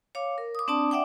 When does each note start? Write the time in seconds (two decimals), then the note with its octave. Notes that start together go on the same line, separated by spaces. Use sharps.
0.15 C#5 F5 D6
0.38 A#4
0.55 D6 D#6
0.68 C4 D4 D5 A5 D6 D#6
0.91 D5 E5 F#5 G5 D6